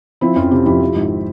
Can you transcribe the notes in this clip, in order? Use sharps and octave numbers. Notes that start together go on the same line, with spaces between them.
F3 C4 E4
F2 C#4 F4
C3 E4 G4
F2 E4 G4
F3
G#1